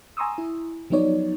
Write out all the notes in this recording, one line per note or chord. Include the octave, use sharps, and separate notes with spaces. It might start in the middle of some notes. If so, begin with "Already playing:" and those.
G#5 A#5 C6 C#6 D#6 E6
E4
F3 F#3 B3 D#4 C#5 D5